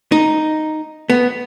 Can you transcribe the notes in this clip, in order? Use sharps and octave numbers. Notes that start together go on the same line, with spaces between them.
D#4
B3